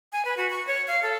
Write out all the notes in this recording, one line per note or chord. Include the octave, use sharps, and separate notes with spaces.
G#5
B4
F#4
C#6
C#5
F5
A4